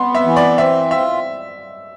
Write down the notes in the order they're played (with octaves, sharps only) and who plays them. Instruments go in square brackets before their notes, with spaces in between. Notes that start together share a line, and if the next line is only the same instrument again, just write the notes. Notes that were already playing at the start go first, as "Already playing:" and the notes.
Already playing: [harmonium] B3 [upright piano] C6
[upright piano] E5
[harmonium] E3
[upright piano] D5
[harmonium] C4 [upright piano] E5
[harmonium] F4 [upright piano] E5